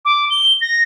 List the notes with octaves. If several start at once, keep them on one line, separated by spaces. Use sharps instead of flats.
D6
G7
A#6